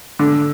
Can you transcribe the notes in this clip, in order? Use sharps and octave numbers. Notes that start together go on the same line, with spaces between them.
D3